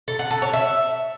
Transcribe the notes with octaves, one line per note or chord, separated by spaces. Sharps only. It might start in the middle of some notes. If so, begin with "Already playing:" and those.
A4
F#5
A4
C#5
E5